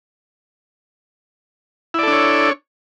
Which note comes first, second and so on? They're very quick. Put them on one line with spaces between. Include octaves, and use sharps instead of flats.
E4 D5 A4 D4 C#5